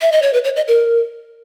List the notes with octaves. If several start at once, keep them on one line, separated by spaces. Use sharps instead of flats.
E5
D#5
C#5
B4
C#5
D#5
A#4